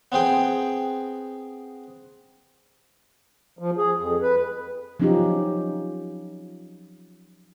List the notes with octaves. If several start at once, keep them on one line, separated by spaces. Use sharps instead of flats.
B3 C4 G#4 G5
F3
G#4
F2
B4
F3 F#3 C#4 D#4 F4 G4